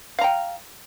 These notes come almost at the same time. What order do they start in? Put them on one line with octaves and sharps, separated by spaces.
F5 A#5 G5